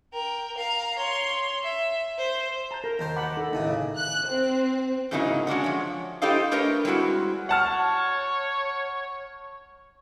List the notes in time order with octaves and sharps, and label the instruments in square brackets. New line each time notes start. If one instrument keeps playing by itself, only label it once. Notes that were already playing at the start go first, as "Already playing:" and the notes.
[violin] A#4 G5
F5 A#5
C#5 C6
E5
C5
[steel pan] A5 [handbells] A#5 G6
[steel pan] A#4 [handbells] A#6
[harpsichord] D#2 D#3 C5
[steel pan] F#5 A5 B5 [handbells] D6
[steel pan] D#4 A4
[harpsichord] D#2 A2 C#3 [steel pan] D#4 [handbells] D#5 E5 G#5
[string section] F#6
C4
[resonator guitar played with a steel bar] G#2 C#3 F#3 A#3 D#4 E4
G#3 C#4 D4 F#4
F3 C#5
E4 G4 A4 C5 D#5 F5
A3 D4 A#4 B4 C#5 D#5
G3 G#3 C4 E4 F#4
[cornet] C#5 [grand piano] F#5 A5 F6